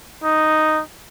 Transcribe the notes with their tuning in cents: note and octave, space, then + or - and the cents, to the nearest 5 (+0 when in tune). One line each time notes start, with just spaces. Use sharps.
D#4 -5